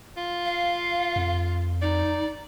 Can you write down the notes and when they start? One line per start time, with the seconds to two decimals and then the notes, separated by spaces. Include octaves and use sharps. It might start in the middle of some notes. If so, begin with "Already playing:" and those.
0.17 F4
0.46 F5
1.16 F2
1.82 D#4 D5